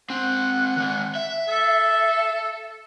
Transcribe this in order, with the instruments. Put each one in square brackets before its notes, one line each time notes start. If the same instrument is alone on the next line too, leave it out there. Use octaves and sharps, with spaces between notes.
[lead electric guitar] G#3 C4 [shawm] F#5
[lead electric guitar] D#3 G#3
E5
[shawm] A4